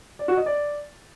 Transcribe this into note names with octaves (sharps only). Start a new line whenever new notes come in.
D5
F#4
D#5
D5